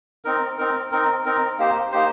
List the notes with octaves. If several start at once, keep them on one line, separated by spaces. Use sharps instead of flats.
C4 D#4 A#4
C4 D#4 A#4
C4 D#4 A#4
C4 D#4 A#4
A#3 D#4 G4 C5
A#3 D#4 G4 C5